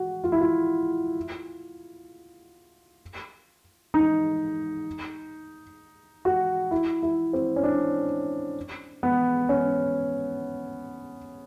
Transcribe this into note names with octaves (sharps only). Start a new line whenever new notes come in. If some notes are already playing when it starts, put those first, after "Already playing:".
Already playing: F#4
F4
E4
F4
D#4
F#4
E4
E4
C4
C#4
D4
B3
C#4